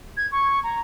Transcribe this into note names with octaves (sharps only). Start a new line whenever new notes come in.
G#6
C#6
A#5